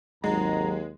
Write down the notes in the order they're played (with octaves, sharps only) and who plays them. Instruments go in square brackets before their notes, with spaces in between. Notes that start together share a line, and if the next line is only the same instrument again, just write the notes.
[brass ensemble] G#1 A#5 [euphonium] D#2 [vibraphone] F#3 [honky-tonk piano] G#3